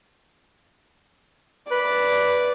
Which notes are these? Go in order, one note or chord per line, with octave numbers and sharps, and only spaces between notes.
B4 D5